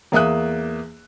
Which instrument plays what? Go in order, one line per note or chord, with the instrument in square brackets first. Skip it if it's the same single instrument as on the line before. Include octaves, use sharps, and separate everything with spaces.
[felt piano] E2 A#3 E5 D#6 F#6